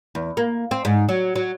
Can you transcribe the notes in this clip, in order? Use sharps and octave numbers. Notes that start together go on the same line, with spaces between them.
E2
A#3
C4
G#2
F#3
F#3